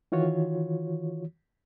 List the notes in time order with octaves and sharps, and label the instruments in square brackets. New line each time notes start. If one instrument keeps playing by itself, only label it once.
[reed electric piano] D#3 E3 F4 F#4 C#5